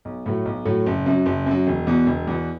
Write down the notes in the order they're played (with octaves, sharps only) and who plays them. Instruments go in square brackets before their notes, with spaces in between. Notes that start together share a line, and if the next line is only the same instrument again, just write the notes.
[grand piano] B1
A2 F#3 A3
B1
A2 F#3 A3
F#1
F#2 F#3
F#1
F#2 F#3
E1
E2 B2
E1
E2 B2